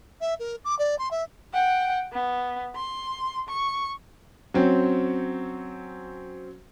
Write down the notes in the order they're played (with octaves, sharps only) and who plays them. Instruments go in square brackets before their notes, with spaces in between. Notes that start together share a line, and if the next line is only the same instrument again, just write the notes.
[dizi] E5
A#4
D6
D5
C6
E5
[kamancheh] F#5 G5
B3
C6
C#6
[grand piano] F#3 C4 C#4